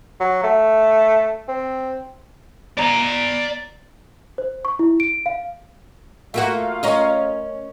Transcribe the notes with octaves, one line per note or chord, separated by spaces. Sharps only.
F#3
A3
C4
D5 A#5
C5
C#6
E4
D7
F5
A3 A#3 F4 F#4 F5
C#4 A#4 D#5